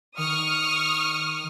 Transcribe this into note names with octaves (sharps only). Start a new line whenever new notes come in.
D#3 C#6 D#6 F6